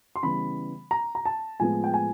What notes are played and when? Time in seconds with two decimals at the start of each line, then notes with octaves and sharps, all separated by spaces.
0.16 C6
0.23 C#3 E3 G3 B3 B5
0.91 A#5
1.15 A#5
1.25 A5
1.60 A2 F3 G#3 B3 G#5
1.84 G5
1.94 G#5